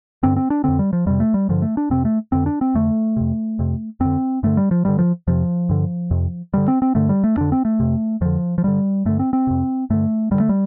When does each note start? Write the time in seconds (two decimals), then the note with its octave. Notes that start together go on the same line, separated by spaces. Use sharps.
0.23 G2 D3 C4
0.37 C4
0.50 D4
0.64 F2 D3 C4
0.79 G3
0.93 F3
1.06 F2 C3 G3
1.20 A3
1.34 G3
1.49 G2 D3 F3
1.62 A3
1.77 D4
1.90 F2 C3 C4
2.05 A3
2.32 F2 D3 C4
2.46 D4
2.61 C4
2.74 F2 D3 A3
3.17 F2 C3
3.59 F2 C3
4.00 F2 D3 C4
4.43 G2 D3 A3
4.57 G3
4.71 F3
4.85 G2 D3 G3
4.99 F3
5.27 F2 C3 F3
5.69 G2 D3
6.11 F2 C3
6.54 G2 D3 G3
6.68 C4
6.82 C4
6.95 G2 D3 A3
7.09 G3
7.24 A3
7.37 F2 D3 D4
7.52 C4
7.65 A3
7.80 F2 C3
8.21 F2 D3 F3
8.58 F3
8.64 G2 D3 G3
9.05 G2 D3 A3
9.19 C4
9.33 C4
9.47 F2 C3
9.90 G2 D3 A3
10.31 G2 D3 G3
10.40 A3
10.49 G3